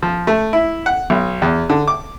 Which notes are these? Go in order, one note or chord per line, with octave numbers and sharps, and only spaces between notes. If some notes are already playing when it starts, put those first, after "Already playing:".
F3
A3
E4
F#5
B1
E2
D3
D6